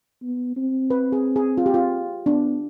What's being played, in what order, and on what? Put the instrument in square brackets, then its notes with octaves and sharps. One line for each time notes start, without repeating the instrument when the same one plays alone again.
[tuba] B3
C4
[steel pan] B4
G#4
G#4
F4
G4
F4
[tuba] B3 [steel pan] D4